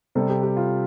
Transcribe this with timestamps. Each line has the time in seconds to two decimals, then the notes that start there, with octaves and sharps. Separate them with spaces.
0.15 C3 G3 A4
0.29 G4
0.43 G4
0.57 F4